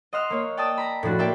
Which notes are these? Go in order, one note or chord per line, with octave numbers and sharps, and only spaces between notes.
D#5 F#5 C6 E6 F6
A#3 C#5
D5 G5 A5 D#6 E6
A#5 B5
A2 F3 D4 F#4
A#3 A4 D5 E5 G5